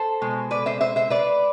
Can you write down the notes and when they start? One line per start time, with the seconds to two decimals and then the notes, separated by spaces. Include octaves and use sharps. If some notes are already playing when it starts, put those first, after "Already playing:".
Already playing: A4 C5
0.21 B2 G#3
0.51 B4 D5
0.66 C5 E5
0.81 C5 E5
0.96 C5 E5
1.10 B4 D5